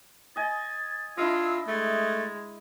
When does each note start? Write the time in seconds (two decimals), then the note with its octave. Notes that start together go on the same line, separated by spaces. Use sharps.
0.36 D#5 G#5 A6
1.17 D4 E4 F4 D#5 E6
1.68 G#3 A3 A6